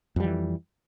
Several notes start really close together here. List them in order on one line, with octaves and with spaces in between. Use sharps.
F2 G3 E3